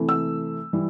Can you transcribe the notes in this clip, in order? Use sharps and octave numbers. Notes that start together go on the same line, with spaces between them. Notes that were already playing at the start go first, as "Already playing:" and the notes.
Already playing: C3 E3 A3
E6
E3 G3